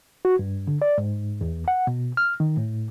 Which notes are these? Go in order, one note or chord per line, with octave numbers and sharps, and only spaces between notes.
F#4
G2
D3
D5
G#2
E2
F#5
B2
F6
D#3
A2